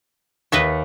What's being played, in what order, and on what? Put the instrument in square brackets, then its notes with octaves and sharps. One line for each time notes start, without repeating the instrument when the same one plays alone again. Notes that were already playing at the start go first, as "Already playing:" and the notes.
[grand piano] D#2 [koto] B4 D#5 E5